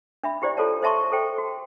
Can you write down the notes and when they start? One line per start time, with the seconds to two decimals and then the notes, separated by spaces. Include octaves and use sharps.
0.23 D4 E5 B5
0.42 E4 G4 C5 D5
0.57 F4 A4 C5 C#5 A5
0.82 C5 D#5 E5 A5 C6 C#6
1.12 A4 C5 G5
1.38 F#4